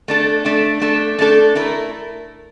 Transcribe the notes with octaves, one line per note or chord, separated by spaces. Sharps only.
A3 D4 A4
A3 D4 A4
A3 D4 A4
A3 D4 A4
A3 E4 A#4